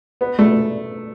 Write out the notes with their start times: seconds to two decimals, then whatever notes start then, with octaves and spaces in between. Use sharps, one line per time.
0.21 B3
0.39 A3